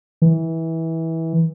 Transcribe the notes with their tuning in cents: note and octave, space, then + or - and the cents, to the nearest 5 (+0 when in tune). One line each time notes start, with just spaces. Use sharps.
E3 -20